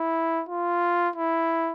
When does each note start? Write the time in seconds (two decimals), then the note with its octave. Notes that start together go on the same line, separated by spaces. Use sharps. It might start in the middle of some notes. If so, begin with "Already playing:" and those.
Already playing: E4
0.49 F4
1.16 E4